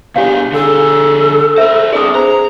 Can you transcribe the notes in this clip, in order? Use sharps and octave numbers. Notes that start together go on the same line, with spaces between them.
B2 D4 G4 C#5 F5 G#5
D3 G#4 A4
A#4 C5 E5
C4 D4 G#4 D5 D#6
G#4 C5 A#5